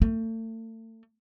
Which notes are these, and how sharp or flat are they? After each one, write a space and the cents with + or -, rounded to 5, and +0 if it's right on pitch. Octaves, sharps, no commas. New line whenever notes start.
A3 +35